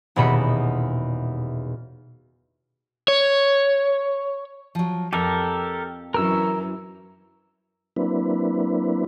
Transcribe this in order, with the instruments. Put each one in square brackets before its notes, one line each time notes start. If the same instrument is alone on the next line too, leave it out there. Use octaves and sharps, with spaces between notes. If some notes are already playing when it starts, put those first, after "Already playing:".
[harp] D#1 E2 B2 D#5 B5 C#7
[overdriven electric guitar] C#5
[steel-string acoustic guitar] F3 F#3
[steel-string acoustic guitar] F2 [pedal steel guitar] G4 A4 A#4
[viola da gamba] F#2 E3 [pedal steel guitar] A#4 E6
[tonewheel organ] F#3 A#3 C4 D4 E4 B4